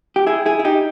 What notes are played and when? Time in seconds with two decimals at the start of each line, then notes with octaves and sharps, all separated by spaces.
0.16 G4
0.27 E4 G#4
0.46 E4 G#4
0.59 E4
0.65 D#4 G4